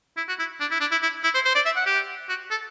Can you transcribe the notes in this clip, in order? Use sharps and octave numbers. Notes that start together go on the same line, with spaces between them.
E4
F#4
E4
D4
E4
D4
E4
E4
E4
C5
C5
D5
E5
F#5
G4
F#4
A4